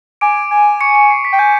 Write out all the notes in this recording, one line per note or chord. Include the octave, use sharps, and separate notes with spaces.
G#5 D6 D7
G#5
C#6 C#7
C#6 C#7
C7
B6
G5
G#5 G6